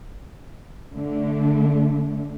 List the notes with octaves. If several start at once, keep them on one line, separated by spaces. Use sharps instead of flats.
D3 A3